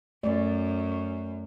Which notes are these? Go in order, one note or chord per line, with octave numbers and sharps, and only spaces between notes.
F#2 A3 D5